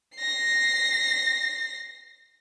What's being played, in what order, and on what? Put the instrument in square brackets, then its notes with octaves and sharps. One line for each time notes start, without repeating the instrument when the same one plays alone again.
[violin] A#6 C7